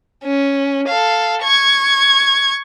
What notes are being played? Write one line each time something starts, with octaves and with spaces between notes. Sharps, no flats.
C#4
A4 F5
C#6 G#6